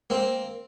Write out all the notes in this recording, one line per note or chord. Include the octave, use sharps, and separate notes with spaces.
A#3 C4